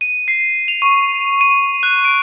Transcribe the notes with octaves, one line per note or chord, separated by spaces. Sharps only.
D#7
C7
F7
C#6
D#7
F#6
D7